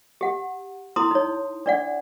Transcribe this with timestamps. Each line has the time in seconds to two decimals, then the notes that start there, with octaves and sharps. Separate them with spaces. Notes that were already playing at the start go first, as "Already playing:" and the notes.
0.21 G4 F#5
0.96 E4 A#5 C6 D#6
1.11 D#4 C#5
1.66 D4 D5 F#5